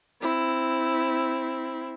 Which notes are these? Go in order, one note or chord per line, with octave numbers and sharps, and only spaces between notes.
C4 E4